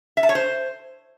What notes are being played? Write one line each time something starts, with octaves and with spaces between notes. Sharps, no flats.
E5
A5
C#5
C5